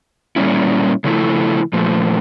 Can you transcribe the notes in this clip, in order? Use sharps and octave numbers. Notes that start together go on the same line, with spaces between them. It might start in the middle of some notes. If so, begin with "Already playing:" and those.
A#2 G3 A#3 C#4 E4
C#3 F3 A3 E4
A#2 F3 A3